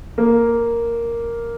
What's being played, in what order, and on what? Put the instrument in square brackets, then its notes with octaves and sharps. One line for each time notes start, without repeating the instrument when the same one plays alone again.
[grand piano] A#3